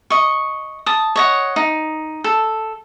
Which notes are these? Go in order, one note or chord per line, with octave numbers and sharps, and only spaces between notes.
D#5 C#6
A5 D#6
C#5 D#5 F#5
D#4
A4